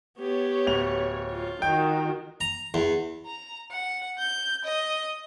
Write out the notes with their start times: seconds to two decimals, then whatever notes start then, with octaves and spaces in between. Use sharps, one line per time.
0.19 B3 G4 C#5
0.66 D1 F7
1.31 F4
1.62 D#3 F#4 G5
2.41 A#5
2.74 E2
3.26 A#5
3.71 F#5
4.18 G6
4.64 D#5